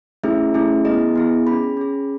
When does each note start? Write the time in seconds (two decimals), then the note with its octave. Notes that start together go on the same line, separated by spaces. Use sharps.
0.23 A3 C#4 E4 G#4 E5
0.54 A3 C#4 E4 G#4
0.85 B3 E4 G#4 D#5
1.16 B3 E4 G#4
1.46 C#4 G#4 B5
1.77 C#4 G#4